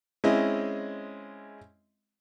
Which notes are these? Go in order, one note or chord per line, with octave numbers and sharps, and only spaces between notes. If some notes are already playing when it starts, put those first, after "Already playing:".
G#3 C4 C#4 E4 D#5 E5